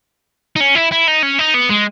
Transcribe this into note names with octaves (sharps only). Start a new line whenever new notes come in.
D#4
C#4
E4
E4
D#4
C#4
D#4
B3
G#3